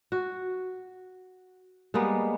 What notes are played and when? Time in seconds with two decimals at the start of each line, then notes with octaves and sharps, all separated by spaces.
0.12 F#4
1.94 G3 G#3 A#3 B3